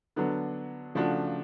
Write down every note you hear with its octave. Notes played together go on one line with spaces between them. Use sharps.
D3 F#3 B3 D4
C#3 F3 A3 D4 F#4